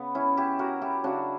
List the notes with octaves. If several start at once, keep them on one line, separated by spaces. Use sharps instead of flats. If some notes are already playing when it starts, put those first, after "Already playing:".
Already playing: C#3 B3
C#4 E4
E4 G4
F#4 A#4
E4 G4
C#3 F#3 D4 F#4